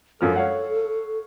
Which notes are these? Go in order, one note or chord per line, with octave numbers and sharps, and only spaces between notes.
F#2 F3 A4 F6
C#5 F5 F#5